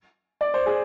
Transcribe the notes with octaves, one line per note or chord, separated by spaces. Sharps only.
D5
C5
G#4